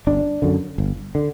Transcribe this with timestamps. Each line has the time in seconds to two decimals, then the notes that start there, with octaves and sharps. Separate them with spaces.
0.07 G1 D4
0.42 F#2 D3
0.78 G1
1.15 D3